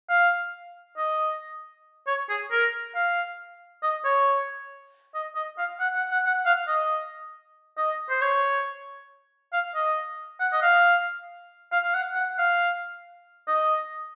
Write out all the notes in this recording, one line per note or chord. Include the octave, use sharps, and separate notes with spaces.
F5
D#5
C#5
G#4
A#4
F5
D#5
C#5
D#5
D#5
F5
F#5
F#5
F#5
F#5
F5
D#5
D#5
C5
C#5
F5
D#5
F#5
D#5
F5
F5
F5
F#5
F#5
F5
D#5